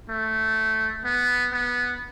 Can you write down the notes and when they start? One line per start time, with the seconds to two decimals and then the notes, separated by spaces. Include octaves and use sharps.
0.09 A3
1.05 B3
1.53 B3